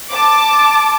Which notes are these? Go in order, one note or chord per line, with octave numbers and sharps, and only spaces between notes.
A5 D6